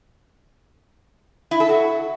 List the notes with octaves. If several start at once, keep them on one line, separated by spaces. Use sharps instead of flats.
E4
A4
F#4